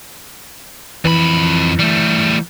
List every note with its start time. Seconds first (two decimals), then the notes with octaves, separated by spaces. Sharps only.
1.05 F2 E3 B5
1.79 G3 A3